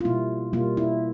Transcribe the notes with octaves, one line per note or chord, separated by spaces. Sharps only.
F4
B2 G3 A#3 E4
B2 G3 A#3 F4
E4